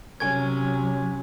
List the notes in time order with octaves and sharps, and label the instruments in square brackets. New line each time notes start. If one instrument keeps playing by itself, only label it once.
[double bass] C3 F#3 [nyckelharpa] C#4 [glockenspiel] G#5 C#6 G#6